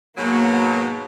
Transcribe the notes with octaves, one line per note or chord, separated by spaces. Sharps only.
G#2 B2 F#3 A#3